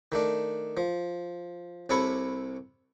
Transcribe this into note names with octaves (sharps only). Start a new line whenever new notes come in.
D#3 A3 D4
F3
C2 C3 A4 C#5 B5 C#6